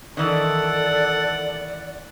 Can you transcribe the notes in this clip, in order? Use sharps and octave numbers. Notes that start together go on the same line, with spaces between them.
D#3 E3 A4 D5 F#5